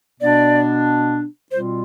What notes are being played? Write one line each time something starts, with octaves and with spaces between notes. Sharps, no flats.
B2 B3 D4 D5
B2 G3 C4 F4 C5